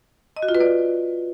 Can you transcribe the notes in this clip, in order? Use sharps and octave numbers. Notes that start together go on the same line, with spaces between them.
D#5
F#4
F4
B4
D5